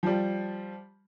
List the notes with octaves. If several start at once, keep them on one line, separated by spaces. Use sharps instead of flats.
F3 G3